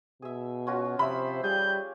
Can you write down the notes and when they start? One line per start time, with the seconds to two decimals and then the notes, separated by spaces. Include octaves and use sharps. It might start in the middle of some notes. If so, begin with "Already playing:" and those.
0.22 B2 G#4 E5
0.67 C#4 F4 F#4
0.99 C3 F3 C5 E5 B5
1.44 G3 G4 G#4 F5 G6